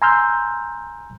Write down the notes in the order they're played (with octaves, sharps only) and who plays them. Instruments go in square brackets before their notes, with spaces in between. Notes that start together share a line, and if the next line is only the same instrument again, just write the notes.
[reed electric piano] G#5 A#5 C6 E6 F6 G6